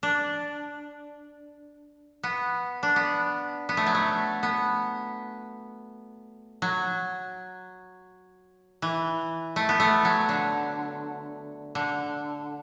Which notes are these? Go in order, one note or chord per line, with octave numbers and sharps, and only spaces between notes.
D4
B3
D4
B3
B3
A3
F#3
A3
B3
F#3
E3
A3
B3
A3
F#3
D3
D3